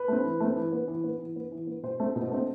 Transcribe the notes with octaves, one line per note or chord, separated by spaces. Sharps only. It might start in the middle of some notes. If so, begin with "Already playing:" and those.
Already playing: B4
A3 C4
E3
A3 C4
E3
B3
E3
B3
E3
B3
E3
B3
B2 C5
A3 C4
B2
A3 C4